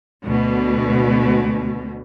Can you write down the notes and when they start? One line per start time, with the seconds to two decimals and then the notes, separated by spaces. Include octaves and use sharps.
0.24 D2 B2